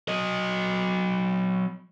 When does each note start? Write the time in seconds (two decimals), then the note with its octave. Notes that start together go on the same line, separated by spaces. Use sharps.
0.08 F#3 D#5